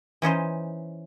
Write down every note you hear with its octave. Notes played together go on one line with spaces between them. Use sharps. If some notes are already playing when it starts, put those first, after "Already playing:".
E3 C#4 D#4 C5